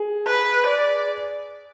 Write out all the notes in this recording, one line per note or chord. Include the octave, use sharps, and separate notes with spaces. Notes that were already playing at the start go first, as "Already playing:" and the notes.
Already playing: G#4
B4
D5